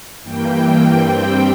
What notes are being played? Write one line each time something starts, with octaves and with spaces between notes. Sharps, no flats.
G2 E3 A#3 G5
G2 G3 C4 G5